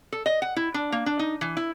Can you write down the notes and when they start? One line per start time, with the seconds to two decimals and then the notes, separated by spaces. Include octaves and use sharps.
0.12 A4
0.26 D#5
0.42 F#5
0.56 E4
0.74 D4
0.92 A#3
1.06 D4
1.19 D#4
1.41 E3
1.57 E4